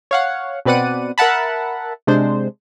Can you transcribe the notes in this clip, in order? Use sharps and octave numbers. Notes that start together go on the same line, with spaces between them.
C#5 F5 F#5
B2 C4 B4 D5 F#5 D#7
A#4 E5 F#5 A5 B5
C3 G#3 D4 C5